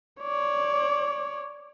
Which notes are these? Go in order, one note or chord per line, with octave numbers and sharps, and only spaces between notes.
C#5 D5